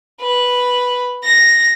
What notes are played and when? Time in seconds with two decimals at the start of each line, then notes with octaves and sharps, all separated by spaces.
0.20 B4
1.24 A#6